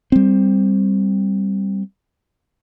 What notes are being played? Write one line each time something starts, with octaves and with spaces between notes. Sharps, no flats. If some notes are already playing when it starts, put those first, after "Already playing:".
G3 C4